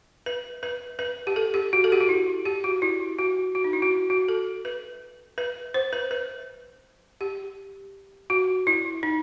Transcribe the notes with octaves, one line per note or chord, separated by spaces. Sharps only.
B4
B4
B4
G4
A4
G4
F#4
A4
G4
F#4
E4
G4
F#4
E4
F#4
F#4
D#4
E4
F#4
F#4
A4
B4
B4
C5
B4
B4
G4
F#4
E4
D#4